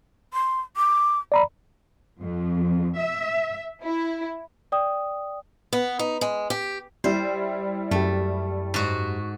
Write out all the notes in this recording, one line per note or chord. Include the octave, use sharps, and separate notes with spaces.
C6
D6
D5 A#5 B5
F2
E5
E4
D5 G5 D#6
B3
D#4
G#3
G4
G3 E4 C5
F#2 A3 G4
G#2 F#4